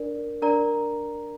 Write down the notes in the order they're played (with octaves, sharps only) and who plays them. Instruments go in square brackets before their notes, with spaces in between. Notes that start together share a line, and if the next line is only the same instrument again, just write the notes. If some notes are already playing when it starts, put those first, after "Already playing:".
Already playing: [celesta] D4 A#4 D5
D4 A#4 D5 A#5